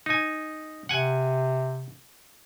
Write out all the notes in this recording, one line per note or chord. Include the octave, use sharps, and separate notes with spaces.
D#4 G#5
C3 F#5 G#5